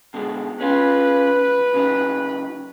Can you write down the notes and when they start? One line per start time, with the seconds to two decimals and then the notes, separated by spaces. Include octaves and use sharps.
0.14 B2 D3 G#3
0.61 C#4 F4 B4
1.74 C#3 F#3 D#4